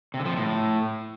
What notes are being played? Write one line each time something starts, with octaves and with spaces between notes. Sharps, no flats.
C3
D3
F3
C3
A2